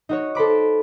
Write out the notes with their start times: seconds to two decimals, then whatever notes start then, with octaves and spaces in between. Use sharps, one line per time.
0.09 D#4 F#4 C#5
0.35 A4 C5 B5 D6